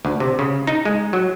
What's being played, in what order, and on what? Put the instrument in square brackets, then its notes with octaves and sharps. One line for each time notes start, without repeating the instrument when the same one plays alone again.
[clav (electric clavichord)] D2
C3
C#3
D#4
G#3
F#3